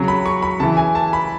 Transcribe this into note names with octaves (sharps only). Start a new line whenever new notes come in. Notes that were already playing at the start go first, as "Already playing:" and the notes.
Already playing: C#3 F#3
B5
C#6
B5
C#3 E3 A5
G#5
A5
B5